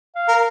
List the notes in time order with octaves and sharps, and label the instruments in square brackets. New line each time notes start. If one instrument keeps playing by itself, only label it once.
[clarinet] F5
[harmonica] A#4